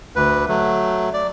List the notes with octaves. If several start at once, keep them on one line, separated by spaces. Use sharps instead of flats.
D2 B4
F#3 A3
D5